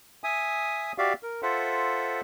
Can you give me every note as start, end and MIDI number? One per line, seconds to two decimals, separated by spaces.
0.24 0.92 76
0.24 0.92 80
0.24 0.92 87
0.98 1.13 66
0.98 1.13 67
0.98 1.13 74
0.98 1.13 76
0.98 1.13 77
1.23 1.41 70
1.43 2.21 65
1.43 2.21 69
1.43 2.21 72
1.43 2.21 76
1.43 2.21 78